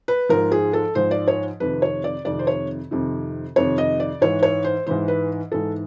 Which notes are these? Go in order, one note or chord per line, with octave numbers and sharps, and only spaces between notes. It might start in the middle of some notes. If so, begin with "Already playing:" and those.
B4
G#2 F3 A#4
G#4
A4
G#2 F3 C5
D5
C#5
F2 C3 D#3 B4
C#5
D5
F2 C3 D#3 D5
C5
C#5
F2 C3 D#3
F2 C3 D#3 C#5
D#5
D5
G#2 E3 C#5
C#5
C5
G#2 E3 C5
B4
G#2 E3 A4